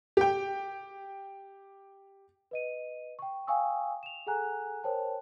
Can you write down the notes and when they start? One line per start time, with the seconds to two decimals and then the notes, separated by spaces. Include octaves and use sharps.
0.17 G4 G5
2.51 B4 D#5 D#7
3.19 G5 C#6
3.47 F5 G5 G#5 C#6 D#6 E6
4.03 E7 F7
4.27 G#4 A4 F#5 G#5 A#5 F#6
4.84 A#4 C5 C#5 G5 A5